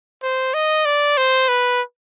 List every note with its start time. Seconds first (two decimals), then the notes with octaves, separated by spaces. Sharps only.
0.23 C5
0.54 D#5
0.85 D5
1.17 C5
1.49 B4